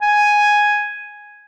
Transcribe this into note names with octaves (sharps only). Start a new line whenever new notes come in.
G#5